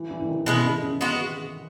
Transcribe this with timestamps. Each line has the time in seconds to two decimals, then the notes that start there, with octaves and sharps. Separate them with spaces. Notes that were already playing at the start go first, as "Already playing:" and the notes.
Already playing: E3
0.11 E3
0.22 E3
0.29 D#3
0.46 B2 E3 G#3 B3
0.55 C#3
0.65 D#3
0.82 C#3
1.01 G#3 B3 F#4